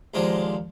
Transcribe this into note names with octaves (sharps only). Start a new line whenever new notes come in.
D#2 D3 F3 G#3 C4 D#4